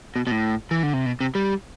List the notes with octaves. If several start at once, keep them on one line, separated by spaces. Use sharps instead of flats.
B2
B2
A2
E3
D3
C3
B2
C3
G3